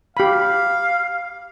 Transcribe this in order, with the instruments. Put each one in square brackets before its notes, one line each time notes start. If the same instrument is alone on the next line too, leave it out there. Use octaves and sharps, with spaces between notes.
[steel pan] G4 B5 [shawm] F5